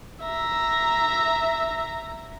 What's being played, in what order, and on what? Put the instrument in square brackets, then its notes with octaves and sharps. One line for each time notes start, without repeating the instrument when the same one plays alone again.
[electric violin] E5 A#5